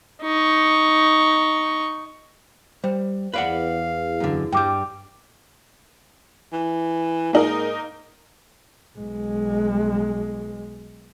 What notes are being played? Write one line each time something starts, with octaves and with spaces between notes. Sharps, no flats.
D#4 C#6
G3 C5
E2 B4 D5 F5 F#5
F#2 D3
G2 G3 G5 D6 G6
E3
G#2 A#3 D#4 A#4
B1 G#3